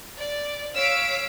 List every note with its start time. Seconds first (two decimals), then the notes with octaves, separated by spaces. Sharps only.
0.19 D5
0.74 C#5 F5 E6 B6 D7